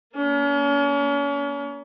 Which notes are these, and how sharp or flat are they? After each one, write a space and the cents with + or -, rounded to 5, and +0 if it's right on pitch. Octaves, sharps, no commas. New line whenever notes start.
A#3 +15 C#4 +40